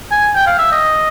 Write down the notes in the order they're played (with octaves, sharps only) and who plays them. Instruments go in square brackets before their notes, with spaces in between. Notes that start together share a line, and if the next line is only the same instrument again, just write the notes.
[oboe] G#5
G5
F5
E5
D#5